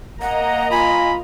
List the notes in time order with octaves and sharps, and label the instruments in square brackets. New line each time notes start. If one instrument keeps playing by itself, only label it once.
[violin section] A#3 D#5 A#5 [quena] F#5
[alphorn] F4 [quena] G#5 [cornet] B5